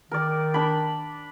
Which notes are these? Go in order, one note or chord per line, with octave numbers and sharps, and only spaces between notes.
D#3 A#4 D5
D4 B5